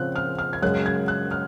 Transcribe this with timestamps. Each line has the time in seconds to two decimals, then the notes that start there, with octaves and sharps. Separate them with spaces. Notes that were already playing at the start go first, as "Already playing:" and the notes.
Already playing: C#3 F3 C4 F#6
0.16 F6
0.39 F6
0.53 G#6
0.62 F#2 C#3 G#3 C#4 F#6
0.86 G#6
1.08 F#6
1.31 F6